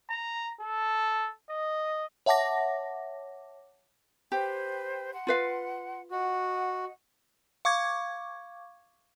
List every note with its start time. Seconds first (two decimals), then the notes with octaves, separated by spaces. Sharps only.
0.10 A#5
0.60 A4
1.50 D#5
2.26 C#5 E5 F#5 A5 D6 A#6
4.32 G4 B4 C5 G5
5.14 F#5 C6
5.27 F4 B4 F5
6.11 F#4 D#5 F#5
7.65 F5 C#6 D6 G#6